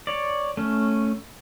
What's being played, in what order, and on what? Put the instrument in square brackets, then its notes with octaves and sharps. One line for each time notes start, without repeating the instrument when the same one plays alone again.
[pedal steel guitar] C#5 D5
A3 C#4